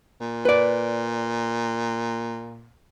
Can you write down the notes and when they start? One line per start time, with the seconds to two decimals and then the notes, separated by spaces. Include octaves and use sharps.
0.21 A#2
0.45 B4 D5